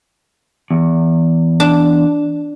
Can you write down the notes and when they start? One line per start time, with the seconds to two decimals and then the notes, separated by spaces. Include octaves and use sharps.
0.71 E2
1.60 D4